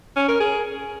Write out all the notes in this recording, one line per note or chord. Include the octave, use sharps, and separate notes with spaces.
C#4
A#4
G#4